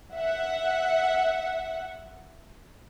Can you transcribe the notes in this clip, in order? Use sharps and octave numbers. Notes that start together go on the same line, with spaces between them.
E5 F#5